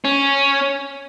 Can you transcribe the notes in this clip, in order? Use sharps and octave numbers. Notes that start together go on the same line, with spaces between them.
C#4